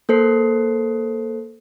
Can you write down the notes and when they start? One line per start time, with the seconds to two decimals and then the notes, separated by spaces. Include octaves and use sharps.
0.09 A#3 A4 C5 C7